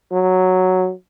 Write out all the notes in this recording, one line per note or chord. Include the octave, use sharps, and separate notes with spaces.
F#3